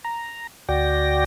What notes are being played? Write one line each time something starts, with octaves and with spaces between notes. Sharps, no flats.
A#5
D2 F#4 D5 G5 A#6